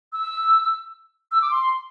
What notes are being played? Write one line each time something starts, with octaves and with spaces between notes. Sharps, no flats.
E6
E6
D6
C6